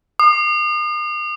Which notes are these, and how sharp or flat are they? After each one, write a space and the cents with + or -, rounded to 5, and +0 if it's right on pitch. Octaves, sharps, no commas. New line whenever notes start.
D#6 -45